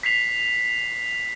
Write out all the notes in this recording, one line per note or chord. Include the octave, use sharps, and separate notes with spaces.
B6 C7 F7